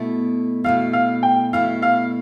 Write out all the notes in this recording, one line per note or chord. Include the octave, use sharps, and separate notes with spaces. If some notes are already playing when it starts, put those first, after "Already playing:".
Already playing: B2 A3 E4
B2 A3 E4 F5
F5
G5
B2 A3 E4 F5
F5